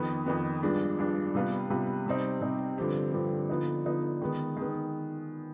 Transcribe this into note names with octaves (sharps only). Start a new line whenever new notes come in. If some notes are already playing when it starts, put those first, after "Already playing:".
Already playing: F2 D#3 B3
F2 D#3 B3
G2 F3 G#3 D4
G2 F3 G#3 D4
C3 G3 B3 F4 B4
C3 G3 B3 F4 B4
C3 G3 C4 D#4
C3 G3 C4 D#4
G2 D3 F3 C4 G4
G2 D3 F3 C4 G4
D3 F3 B3 D#4
D3 F3 B3 D#4
D#3 G#3 B3
D#3 G#3 B3